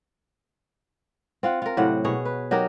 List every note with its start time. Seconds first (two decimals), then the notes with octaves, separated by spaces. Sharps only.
1.43 C4 F4 F#5
1.62 F4 A#4
1.77 A2 C3 F#3 F#5
2.05 B2 G#4 C#5
2.25 B4
2.51 F#3 D#4 G4 A#4